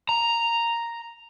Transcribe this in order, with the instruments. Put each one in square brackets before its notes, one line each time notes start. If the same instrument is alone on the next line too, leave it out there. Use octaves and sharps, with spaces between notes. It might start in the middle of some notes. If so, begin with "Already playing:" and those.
[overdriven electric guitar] A#5